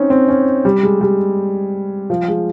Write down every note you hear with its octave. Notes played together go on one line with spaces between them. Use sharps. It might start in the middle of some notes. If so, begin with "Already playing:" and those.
Already playing: C4 C#4 D#4
C4
C#4
G3
G#3
G3
F3
G#3